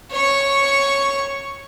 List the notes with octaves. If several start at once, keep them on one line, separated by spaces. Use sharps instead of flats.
C#5 C#6